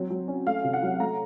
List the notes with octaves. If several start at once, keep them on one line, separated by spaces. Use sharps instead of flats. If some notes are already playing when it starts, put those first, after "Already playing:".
Already playing: F#3 C4
F#3
C#4
A3 F5
C3
F#5
F#3
A3 A#5